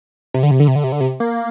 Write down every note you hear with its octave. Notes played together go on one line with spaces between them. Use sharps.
C3
D3
C3
D3
C3
D3
C3
D3
C3
A#3